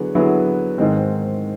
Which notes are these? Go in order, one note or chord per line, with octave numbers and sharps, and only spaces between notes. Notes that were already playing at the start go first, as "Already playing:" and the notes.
Already playing: D3 F#3 B3 E4 G#4
D3 F#3 B3 E4 G#4
G#2 D#3 G#3 C4